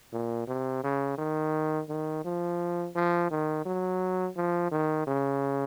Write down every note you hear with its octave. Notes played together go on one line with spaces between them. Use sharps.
A#2
C3
C#3
D#3
D#3
F3
F3
D#3
F#3
F3
D#3
C#3